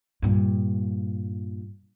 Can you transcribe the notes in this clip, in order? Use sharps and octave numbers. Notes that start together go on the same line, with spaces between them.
G2 A#2